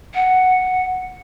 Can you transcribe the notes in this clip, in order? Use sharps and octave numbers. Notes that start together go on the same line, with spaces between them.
F#5